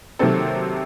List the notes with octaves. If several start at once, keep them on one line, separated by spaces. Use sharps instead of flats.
C3 D#3 F#3 A#3 C4 A4